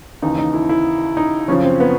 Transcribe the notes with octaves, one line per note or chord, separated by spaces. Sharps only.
D#2 C#3 E3 D#4
D#4
E4
E4
D#4
F#2 C#3 F3 C#4
C4
B3